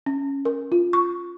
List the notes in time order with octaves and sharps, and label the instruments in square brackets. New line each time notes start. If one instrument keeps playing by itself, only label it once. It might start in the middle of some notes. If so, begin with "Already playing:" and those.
[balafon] C#4
A#4
F4
C#6